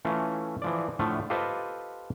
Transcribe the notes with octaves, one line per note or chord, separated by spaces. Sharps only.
E3 A3 C#4 F4
E3 F3 D5
A2 D3 F3 A3 F4
F4 G4 A4 B4 C5 D#5